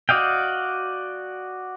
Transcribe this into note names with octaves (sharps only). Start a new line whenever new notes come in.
F#4 D5 D#5 F5 G5